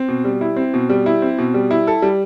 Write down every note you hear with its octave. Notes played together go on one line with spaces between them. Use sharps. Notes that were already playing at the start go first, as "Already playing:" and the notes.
Already playing: C4
B2
G3
E4
C4
B2
G3
E4
C4
B2
G3
E4
A4
G3